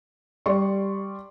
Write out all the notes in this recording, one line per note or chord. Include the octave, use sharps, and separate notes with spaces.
G3 D5 C6 C#6